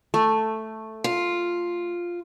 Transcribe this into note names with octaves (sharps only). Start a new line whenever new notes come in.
A3
F4